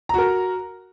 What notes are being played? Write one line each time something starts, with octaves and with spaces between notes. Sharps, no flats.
F#4 A#4 A#5